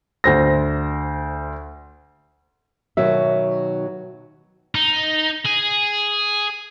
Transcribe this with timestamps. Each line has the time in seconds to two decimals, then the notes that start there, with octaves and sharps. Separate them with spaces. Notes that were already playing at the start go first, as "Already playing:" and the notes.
0.24 D2 C5 A#6
2.97 B2 D#3 F#3 E5
4.75 D#4
5.45 G#4